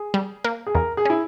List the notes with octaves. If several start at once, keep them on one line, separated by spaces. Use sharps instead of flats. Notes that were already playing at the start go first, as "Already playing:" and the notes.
Already playing: G#4
G3
A#3
G#4
E2 A#4
G#4
C#4 E4